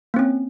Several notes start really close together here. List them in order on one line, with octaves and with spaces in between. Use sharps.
A#3 C4 C#4